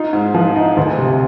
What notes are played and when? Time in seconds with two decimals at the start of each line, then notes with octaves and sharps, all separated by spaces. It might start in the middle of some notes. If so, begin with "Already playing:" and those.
Already playing: D#4 F4
0.13 G#2
0.34 F3
0.56 D#4
0.77 D2
0.99 C3